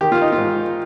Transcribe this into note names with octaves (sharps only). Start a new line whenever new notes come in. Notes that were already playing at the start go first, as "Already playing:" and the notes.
D#3 G4
F4
D#4
F4
G#2